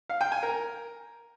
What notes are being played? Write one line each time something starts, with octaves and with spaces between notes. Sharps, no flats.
F5
G5
G#5
A#4